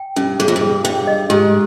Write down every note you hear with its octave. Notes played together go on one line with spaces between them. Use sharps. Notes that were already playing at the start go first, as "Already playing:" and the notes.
Already playing: G5
G2 C#4
G2 G#4
F2
G2
G#4
G2 G5
D#5
G#2 G4